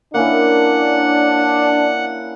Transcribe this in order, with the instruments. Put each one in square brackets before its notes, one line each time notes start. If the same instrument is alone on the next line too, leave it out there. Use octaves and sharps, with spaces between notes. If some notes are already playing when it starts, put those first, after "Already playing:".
[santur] A#3 C#4 E4 [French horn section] D4 [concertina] F#5